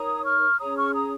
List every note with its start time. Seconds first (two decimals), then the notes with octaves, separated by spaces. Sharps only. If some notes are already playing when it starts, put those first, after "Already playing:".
Already playing: D#4 A#4 C#5 A#5 D#6
0.24 C#6 F6
0.59 C#4 G#4 C#5 A#5 D#6
0.76 C#6 F6
0.94 A#5 D#6